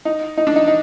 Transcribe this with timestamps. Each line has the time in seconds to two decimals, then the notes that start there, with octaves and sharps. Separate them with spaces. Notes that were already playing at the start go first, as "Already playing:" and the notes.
0.05 D#4
0.37 D#4
0.47 D4
0.56 D#4
0.67 D#4